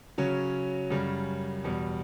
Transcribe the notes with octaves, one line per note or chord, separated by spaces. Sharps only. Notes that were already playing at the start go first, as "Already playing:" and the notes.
C#3 F#3 C#4 F#4
F#2 C#3 G3
E2 B2 G3